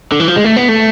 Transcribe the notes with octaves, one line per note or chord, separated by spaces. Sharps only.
D3
E3
F3
G#3
A3
B3
A3